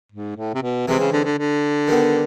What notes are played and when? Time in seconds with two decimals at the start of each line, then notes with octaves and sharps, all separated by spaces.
0.12 G#2
0.37 A2
0.55 C3
0.62 B2
0.87 C3 E3 G#3 C4
1.00 C#3
1.12 D3
1.25 D3
1.38 D3
1.88 D#3 G3 B3